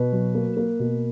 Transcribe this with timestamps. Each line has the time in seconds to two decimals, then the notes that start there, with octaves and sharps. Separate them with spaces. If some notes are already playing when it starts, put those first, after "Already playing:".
Already playing: B2 B4
0.13 F#3
0.35 A#3
0.57 A#3
0.80 B2